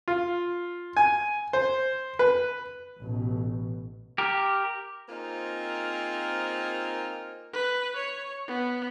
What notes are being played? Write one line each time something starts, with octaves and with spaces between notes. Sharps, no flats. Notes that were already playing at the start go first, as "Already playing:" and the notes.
F4
G#5
C5
B4
A1 B2
G4 A#4
A#3 C4 D#4 F4 G#4 A#4
B4
C#5
B3